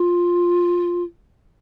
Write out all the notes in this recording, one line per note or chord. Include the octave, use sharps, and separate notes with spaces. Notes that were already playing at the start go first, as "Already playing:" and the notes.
Already playing: F4